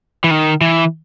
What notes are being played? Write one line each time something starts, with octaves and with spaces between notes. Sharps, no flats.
E3
D#3
E3